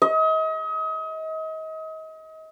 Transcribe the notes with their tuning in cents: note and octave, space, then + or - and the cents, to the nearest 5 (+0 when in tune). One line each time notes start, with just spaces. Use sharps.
D#5 +35